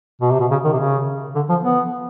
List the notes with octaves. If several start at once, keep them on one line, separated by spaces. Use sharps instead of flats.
B2
C3
B2
C#3
D#3
C3
C#3
D3
F3
B3